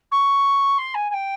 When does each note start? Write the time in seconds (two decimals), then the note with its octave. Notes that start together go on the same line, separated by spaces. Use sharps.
0.11 C#6
0.78 C6
0.94 G#5
1.10 G#5
1.13 G5